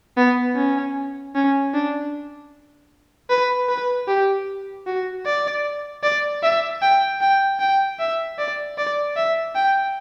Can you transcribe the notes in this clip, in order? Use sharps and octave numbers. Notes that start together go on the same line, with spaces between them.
B3
C#4
C#4
D4
B4
B4
G4
F#4
D5
D5
E5
G5
G5
G5
E5
D5
D5
E5
G5